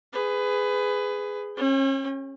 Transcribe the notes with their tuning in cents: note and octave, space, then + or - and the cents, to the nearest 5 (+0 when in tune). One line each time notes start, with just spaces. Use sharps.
G#4 +0 B4 +20
C#4 -35 G5 +35